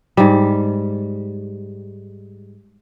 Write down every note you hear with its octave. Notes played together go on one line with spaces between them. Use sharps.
G#2 G3